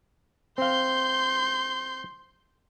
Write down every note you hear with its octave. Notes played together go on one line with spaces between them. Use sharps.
C4 F5 C6 G6